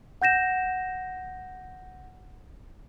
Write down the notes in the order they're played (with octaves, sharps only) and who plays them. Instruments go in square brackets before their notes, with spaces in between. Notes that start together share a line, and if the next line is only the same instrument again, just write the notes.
[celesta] F#5 G6 A#6 E7